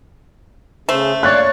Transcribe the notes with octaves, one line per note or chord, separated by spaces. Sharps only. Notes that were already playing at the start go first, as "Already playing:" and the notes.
C#3 A3 C5
C#5 D5 F5 F#6 A6